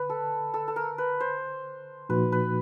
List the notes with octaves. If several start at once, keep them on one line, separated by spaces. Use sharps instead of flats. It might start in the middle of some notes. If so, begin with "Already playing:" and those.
Already playing: D3 B4
A4
A4
A4
A#4
B4
C5
A#2 F3 A#3 D#4 F#4 B4
B4